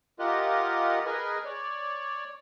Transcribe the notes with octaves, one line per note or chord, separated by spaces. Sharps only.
F4 G4 A#4 D#5 F#5
G#4 A#4 B4 D#5 G#5
C#5 D5